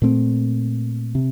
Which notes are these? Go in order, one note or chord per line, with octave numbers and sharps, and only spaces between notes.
A#2 A3 C4
C3